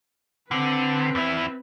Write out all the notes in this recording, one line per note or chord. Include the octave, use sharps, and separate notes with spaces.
D3 C4 B4
E2 E4